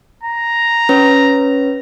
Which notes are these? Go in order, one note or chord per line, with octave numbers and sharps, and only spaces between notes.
A#5
C#4 B4 C#5